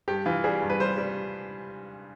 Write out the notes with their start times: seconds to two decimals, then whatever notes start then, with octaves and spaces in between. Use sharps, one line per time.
0.08 G2 G4
0.26 E3 F4
0.44 G3 G#4
0.62 G2
0.70 B4
0.80 G3 C5
0.98 G3